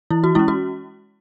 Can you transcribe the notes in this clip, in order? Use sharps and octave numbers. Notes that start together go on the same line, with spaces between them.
E3 E4
F#4
G#3 C#4 E4
F#4